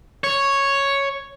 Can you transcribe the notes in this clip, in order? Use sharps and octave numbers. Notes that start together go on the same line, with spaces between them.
C#5